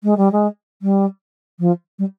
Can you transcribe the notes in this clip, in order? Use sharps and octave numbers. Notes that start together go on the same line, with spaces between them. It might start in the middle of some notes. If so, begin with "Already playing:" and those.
G#3
G3
G#3
G3
F3
G3